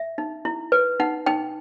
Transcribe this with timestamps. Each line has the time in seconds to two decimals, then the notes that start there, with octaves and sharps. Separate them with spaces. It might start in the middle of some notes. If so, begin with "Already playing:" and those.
Already playing: E5
0.18 D#4
0.45 E4
0.72 B4
1.00 D#4 F#5
1.26 D#4 G5